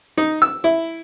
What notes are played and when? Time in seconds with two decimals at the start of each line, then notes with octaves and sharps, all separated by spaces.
0.17 D#4
0.42 E6
0.64 E4